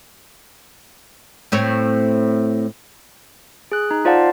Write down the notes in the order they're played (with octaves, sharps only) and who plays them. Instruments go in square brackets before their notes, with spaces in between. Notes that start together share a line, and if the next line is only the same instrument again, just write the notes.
[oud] A2 C4 C#5
[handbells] G#4 F#6
D#4
F4 C5 D5 F5 F#5 A5